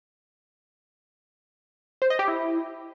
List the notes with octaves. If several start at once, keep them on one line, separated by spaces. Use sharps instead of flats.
C5
D#5
G4
E4